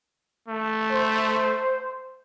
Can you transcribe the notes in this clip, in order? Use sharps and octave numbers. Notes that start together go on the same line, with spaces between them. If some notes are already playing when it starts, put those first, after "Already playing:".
A3
C5